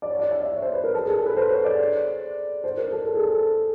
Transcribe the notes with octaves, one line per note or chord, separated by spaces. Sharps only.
D5
C#5
D5
E5
D5
C#5
C5
B4
A#4
A4
G#4
A4
B4
C5
C#5
D5
C5
A#4
A4
A4
G#4
A4